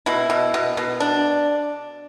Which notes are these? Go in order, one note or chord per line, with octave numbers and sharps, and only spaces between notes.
B2 E4
B2
B2
B2
D4